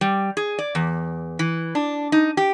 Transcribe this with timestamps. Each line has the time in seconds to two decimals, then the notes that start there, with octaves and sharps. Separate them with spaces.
0.01 G3
0.37 G#4
0.59 D5
0.75 E2
1.39 E3
1.75 D4
2.12 D#4
2.37 G4